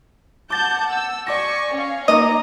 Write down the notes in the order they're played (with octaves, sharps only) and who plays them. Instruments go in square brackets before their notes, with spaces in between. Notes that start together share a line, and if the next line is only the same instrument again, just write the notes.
[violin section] F#5 A5 G6 [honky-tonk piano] D6 A6
[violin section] E6
[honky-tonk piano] D5 D6 A#6 [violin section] G#5 C#6
[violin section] C#4 C#5 F5
[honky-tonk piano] A#3 D#4 D6 [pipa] D#5 [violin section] A#5